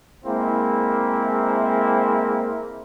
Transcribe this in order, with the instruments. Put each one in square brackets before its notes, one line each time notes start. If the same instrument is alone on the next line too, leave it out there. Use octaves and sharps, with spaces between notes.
[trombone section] G#3 A#3 C4 E4